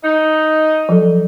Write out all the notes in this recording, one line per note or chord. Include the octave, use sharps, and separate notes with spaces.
D#4
F3 F#3 A4